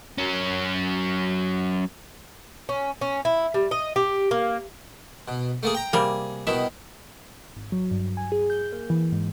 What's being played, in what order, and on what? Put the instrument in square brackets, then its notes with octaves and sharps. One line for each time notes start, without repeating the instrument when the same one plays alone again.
[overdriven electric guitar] F#3 C#4
[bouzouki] C#4
C#4
E4
G3
D#5
G4
A#3
[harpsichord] B2
A3 A#3 G#4
G5 A#5
[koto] C3 G3 A#3 [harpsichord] G#4
[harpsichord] B2 D#3 E4 [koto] E5
[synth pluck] G#1
F#3
G2
G#5
G#4
G6
A#3
E3
G#2